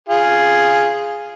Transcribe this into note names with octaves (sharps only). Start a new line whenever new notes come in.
F4 G#4